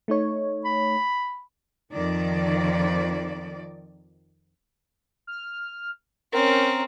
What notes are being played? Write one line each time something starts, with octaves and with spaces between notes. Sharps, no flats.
A3 D#4 C#5
B5
F2 D#3 F3 D5
F6
C4 C#4 A#4